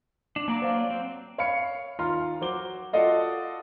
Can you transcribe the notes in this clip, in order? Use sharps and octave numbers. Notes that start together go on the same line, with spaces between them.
D4
F#3 A#3 D5 A5 A#5 D6
C5 F5
C4
C#5 F5 B5 C7 C#7
D#2 F4 A#5 C6 F6
F#3 F#4 C5 D6 G7
F4 F#4 A4 D5 D#5 F5